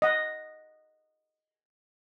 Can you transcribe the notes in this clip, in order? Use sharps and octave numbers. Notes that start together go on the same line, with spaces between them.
D#5 F#5